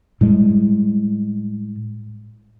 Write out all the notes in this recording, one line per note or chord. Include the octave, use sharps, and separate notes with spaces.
A2 G3 G#3